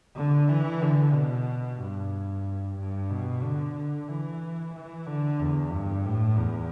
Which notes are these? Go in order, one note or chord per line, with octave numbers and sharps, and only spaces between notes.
D3
E3
D3
B2
G2
G2
B2
D3
E3
E3
D3
E2
G2
A2
E2